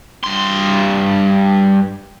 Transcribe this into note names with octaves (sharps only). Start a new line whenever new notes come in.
G2 C6